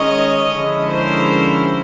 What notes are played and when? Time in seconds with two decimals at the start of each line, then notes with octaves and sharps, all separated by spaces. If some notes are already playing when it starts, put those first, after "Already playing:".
Already playing: D#3 G#3 C#4 C#5 D#5
0.51 D3 F3 G#3 C#4 E4
0.89 A#4 C5